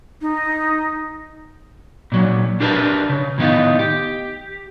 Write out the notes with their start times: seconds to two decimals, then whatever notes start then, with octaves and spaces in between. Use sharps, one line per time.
0.22 D#4
2.12 A#2 F#3
2.60 D4 G4 A#4 B4 A5
3.09 C#3
3.38 A2 D#3 B3 D#4 F4
3.79 G4